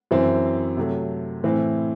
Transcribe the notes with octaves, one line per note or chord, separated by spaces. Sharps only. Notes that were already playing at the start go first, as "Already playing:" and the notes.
F#2 E3 C4 E4 C5
C3 F#3 A3
A2 E3 C4 E4